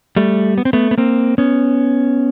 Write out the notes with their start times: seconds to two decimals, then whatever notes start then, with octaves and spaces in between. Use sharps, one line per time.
0.16 G3 A3
0.58 B3
0.65 C4
0.73 A3 B3
0.91 B3
0.98 A#3 C4
1.38 B3 C#4